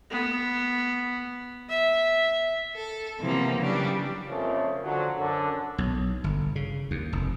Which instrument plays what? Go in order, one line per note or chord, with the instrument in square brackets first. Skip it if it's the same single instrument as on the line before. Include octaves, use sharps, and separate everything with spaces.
[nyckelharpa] B3
E5
[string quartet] A4
C3 E3 F3 G3 A#3 B3
C#3 F#3 G3 D4
[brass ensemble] F2 C#3 F3 A3 A#3
D3 F3 F#3
F#2 D3
[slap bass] B1
G1
C#3
D#2
F1